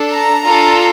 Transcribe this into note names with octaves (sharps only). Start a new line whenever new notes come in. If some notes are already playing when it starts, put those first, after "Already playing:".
Already playing: D4 A4
A#5
D4 F4 A4